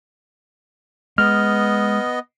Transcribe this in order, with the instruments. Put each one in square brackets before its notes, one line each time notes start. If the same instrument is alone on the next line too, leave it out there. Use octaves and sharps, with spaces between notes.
[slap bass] G#3 [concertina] B3 D#5 [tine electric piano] F6